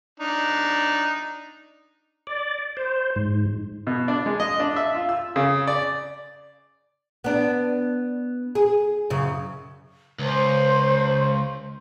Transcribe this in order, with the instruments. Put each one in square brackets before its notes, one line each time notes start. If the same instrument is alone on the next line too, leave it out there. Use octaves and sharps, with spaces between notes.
[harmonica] D4 D#4
[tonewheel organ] D5
C5
G#2
[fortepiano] B2
D4
G#3
D#5
D4
E5
F4
E6
C#3
D5
[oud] B3 D4
G#4
F#2 C#3
[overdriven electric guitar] C#2 [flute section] C5